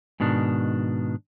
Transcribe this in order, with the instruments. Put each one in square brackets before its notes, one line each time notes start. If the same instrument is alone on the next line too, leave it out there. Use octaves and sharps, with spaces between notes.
[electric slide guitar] G#2 B2 D#3 D4